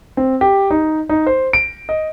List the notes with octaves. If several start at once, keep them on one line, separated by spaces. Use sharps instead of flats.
C4
G4
D#4
D#4
C5
D7
D#5